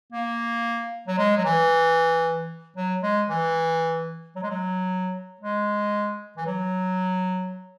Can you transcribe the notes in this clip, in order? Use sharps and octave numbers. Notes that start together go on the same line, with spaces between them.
A#3
F#3
G#3
F#3
E3
F#3
G#3
E3
F#3
G#3
F#3
G#3
E3
F#3